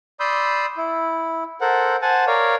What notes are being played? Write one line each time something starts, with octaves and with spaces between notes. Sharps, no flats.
D5 B5 C6 D#6 E6 G6
E4
A4 A#4 C5 F#5
C5 F#5 G#5 A5
A#4 C#5 D5 F5